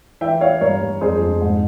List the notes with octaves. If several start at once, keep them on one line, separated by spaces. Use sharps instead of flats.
E3 E5 G5
E3 C#5 F5
G2 A#4 C#5
G2
F2 G#4 C5
F2
G#2